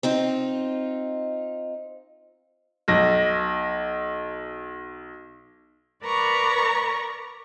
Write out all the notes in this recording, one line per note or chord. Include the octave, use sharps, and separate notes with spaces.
C4 D#4 F4
B1 A#6
A#4 B4 D5 A#5 C#6